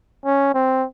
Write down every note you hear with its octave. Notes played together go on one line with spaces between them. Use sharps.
C#4
C4